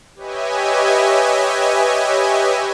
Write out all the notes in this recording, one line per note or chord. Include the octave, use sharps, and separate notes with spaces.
G4 B4 C#5 D#5 E5 G#5